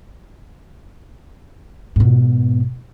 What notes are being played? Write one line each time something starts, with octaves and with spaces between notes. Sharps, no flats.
G#2 B2